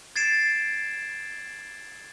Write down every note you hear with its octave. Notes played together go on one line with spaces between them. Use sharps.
G#6 A6 C7 D7 E7